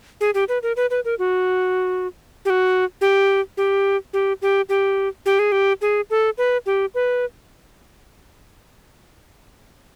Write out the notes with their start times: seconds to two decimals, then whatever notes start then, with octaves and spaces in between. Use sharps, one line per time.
0.21 G#4
0.34 G4
0.49 B4
0.63 A#4
0.76 B4
0.90 B4
1.05 A#4
1.19 F#4
2.45 G4
2.50 F#4
3.01 G4
3.57 G4
4.13 G4
4.42 G4
4.69 G4
5.26 G4
5.39 G#4
5.52 G4
5.81 G#4
6.10 A4
6.38 B4
6.66 G4
6.95 B4